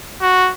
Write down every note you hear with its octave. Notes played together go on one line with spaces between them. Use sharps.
F#4